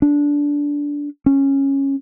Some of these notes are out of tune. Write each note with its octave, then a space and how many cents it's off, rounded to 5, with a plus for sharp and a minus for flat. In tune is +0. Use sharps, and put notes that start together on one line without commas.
D4 -15
C#4 -10